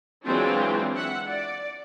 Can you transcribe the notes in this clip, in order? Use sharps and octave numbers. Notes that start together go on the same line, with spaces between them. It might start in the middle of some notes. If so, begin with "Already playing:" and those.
E3 F#3 G#3 C4 D4 F4
E5 F#5
D5